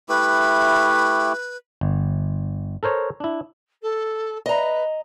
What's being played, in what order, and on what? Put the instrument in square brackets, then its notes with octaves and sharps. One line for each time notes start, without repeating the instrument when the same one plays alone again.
[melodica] A3 E4 G4 [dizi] B4
[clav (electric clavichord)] G1
A4 A#4 C5 C#5
D4 E4
[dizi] A4
[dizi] B4 [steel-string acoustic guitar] D#5 A#5